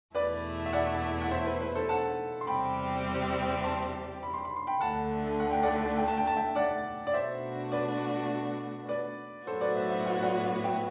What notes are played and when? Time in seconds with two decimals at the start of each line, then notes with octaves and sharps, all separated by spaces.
0.15 E2 B2 A3 E4 B4 D5
0.66 E5
0.73 D5 F#5
1.22 F#5
1.31 C5 E5
1.46 B4
1.60 B4
1.75 A4 C5
1.89 F#5 A5
2.41 C6
2.47 E2 C3 G3 C4 G4 G5 B5
3.64 A5 C6
4.23 B5
4.34 C6
4.45 B5
4.56 C6
4.67 G5 B5
4.80 D2 D3 A3 F#5 A5
5.40 F#5
5.51 G5
5.63 D5 F#5
5.97 G5
6.08 A5
6.17 G5
6.27 A5
6.36 E5 G5
6.55 D5 F#5
7.07 D5
7.14 B2 A3 D4 F#4 C5 E5
7.72 B4 D5
8.88 B4 D5
9.46 A2 F#3 B3 F#4 A4 C5
9.61 B4 D5
9.76 C5 E5
9.90 C5 E5
10.05 F#5
10.14 E5
10.22 D5 F#5
10.63 E5 G5